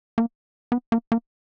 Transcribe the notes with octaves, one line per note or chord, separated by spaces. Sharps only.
A#3
B3
A#3
A#3